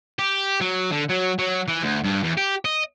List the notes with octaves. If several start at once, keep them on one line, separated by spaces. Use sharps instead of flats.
G4
F#3
D3
F#3
F#3
E3
D2
G2
E2
G4
D#5